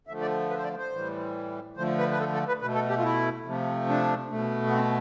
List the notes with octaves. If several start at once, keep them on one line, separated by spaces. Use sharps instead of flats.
D3 F3 A3 E5
D5
B4
C5
D5
C5
A2 E3 G3
D3 F3 A3 C5
B4
B4
A4
A4
B4
B2 A3 B4
A4
G4
F4
E4
C3 F3 A3
D4
B2 A3
B3
C4